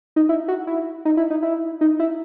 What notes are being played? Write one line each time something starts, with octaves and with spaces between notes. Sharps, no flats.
D#4
E4
F#4
E4
D#4
E4
D#4
E4
D#4
E4